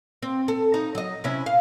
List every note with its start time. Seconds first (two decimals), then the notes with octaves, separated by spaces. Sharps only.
0.22 C4
0.48 A4
0.74 D#4
0.95 F#3 D#5
1.24 C3 C#4 E4
1.46 F5